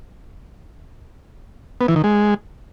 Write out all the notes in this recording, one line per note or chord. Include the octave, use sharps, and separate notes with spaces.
B3
E3
D#3
G#3